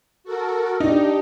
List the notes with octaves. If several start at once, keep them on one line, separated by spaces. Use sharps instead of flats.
F#4 A4 A#4
D4 D#4 G4